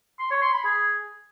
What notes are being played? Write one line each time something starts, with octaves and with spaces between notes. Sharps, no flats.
C6
C#5
C6
B5
G#4